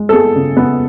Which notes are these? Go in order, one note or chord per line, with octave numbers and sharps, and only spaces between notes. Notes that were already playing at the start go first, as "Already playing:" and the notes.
Already playing: G#3
A4
B3 G#4
C#3
B3